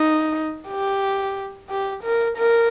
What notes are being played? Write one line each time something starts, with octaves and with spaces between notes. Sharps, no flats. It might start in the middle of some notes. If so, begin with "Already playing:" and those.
Already playing: D#4
G4
G4
A#4
A#4